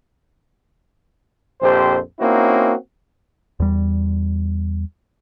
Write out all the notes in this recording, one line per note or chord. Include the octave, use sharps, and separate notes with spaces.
A#1 F2 G4 C5
A#3 C4 C#4 D#4 E4 F#4
E2 G3